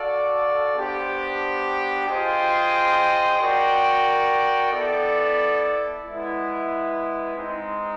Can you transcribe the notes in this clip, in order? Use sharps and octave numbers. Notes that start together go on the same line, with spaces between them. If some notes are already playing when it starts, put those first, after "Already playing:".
Already playing: F#4 A4 D5 F5
B3 D4 G4 C5
F4 G#4 C5 D#5 G5
F#4 A#4 D5 G5
B3 E4 A4 D5
G#3 B3 E4
G#3 C4 D#4